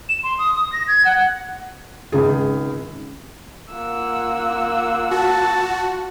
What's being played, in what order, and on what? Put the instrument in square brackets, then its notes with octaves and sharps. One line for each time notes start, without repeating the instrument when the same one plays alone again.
[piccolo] E7
C6
D#6
D#6
A#6
G#6
F#5
[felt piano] G#1 C#2 G#4
[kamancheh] A#3 E6 [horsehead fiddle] F4 F#5
[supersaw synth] F#4 [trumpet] A5